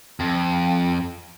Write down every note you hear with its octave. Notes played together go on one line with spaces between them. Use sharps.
F2